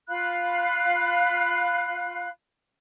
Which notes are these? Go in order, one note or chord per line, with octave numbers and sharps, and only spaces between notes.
F4 F5 B5 F#6